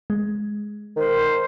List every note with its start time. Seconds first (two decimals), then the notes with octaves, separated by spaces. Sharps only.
0.10 G#3
0.96 D#3 A#4 C5